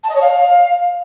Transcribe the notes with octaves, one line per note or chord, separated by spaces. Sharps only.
A5
D#5
C#5
F5